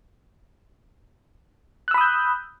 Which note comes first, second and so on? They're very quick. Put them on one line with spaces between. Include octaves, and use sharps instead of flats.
F#6 E6 B5 D#6 G6